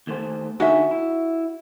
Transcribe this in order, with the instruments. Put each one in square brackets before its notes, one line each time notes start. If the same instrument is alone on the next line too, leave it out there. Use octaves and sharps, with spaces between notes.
[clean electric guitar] D#2 A3 C5
[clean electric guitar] D3 D#4 G#4 [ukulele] F#4 E5
[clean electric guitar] E4